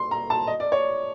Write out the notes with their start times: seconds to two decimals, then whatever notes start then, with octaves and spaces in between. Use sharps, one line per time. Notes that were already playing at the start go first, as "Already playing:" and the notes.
Already playing: C6
0.11 A#5
0.30 A5
0.47 D#5
0.60 D5
0.72 C#5